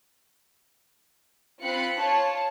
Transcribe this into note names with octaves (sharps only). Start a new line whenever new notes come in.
C4 F4 B5 F#6 C#7
F4 C#5 A5